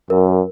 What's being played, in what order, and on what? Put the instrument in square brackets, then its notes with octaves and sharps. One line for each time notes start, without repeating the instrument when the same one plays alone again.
[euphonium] F#2 [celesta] A#4